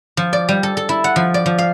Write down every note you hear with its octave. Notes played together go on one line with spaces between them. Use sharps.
F3
D5
G3
A4
A4
E4
F#5
F3
D5
F3
F5